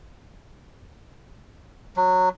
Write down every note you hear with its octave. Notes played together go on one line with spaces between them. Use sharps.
F#3